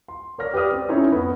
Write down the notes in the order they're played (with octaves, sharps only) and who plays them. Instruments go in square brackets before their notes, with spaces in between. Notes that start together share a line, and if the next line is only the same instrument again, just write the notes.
[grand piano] C6
A#4 C#5 D5 F6 A#6
G4 B4 D5 D#6 F6
C4
C#4 D#4 E4 A4 C#5
F2 B3